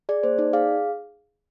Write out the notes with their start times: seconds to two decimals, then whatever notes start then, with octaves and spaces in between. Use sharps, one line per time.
0.09 G#4 D5
0.23 A#3 C5
0.38 D#4 D5
0.53 G#4 F5